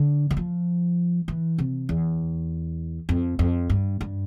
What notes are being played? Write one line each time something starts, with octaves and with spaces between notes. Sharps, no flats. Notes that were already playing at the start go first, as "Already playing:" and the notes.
Already playing: D3
E3
F3
E3
C3
E2
F2
F2
G2
G2